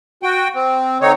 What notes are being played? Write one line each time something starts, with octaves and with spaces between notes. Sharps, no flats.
F#4 G5
C4
D3 C4 D#4 C#5